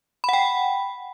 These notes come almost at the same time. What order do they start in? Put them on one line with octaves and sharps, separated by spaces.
B5 F#5 G5